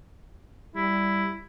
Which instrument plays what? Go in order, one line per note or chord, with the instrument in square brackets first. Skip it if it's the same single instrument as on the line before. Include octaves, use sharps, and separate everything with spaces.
[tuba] G3 [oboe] E4